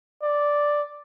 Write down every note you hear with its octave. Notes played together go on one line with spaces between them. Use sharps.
D5